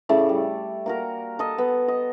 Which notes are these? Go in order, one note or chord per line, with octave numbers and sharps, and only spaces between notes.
A2 C#3 A3 D5
G3
A#3 F#4 A#4
A4 D#5
B3
D#5